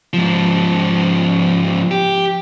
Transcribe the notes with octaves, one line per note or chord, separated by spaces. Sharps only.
G#2 F3
G4